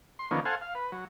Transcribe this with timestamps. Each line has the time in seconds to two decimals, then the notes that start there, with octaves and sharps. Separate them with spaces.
0.19 C6
0.31 D3 D#3 F3 A#3 B3 C#4
0.45 A4 C5 F5 F#5 G#5
0.61 F5
0.75 B4
0.92 F#3